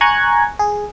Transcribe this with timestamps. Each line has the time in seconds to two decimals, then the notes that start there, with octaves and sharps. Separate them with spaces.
0.01 G#5 A#5 C#6 F#6 G#6
0.59 G#4